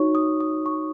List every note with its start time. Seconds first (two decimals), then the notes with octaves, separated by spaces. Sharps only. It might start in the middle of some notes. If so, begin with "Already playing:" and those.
Already playing: D#4 F#4 C#5 C#6
0.15 D#6
0.40 D#6
0.66 C#6